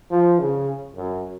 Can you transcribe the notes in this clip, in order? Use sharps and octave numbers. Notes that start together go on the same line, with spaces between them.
F3
C#3
F#2